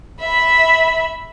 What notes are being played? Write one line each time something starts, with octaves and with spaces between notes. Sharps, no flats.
E5 B5